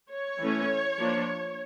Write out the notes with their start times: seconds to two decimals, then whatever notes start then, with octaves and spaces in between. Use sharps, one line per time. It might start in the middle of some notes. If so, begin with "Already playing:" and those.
0.11 C#5
0.39 E3 A3 C#4
0.98 F3 A#3 D4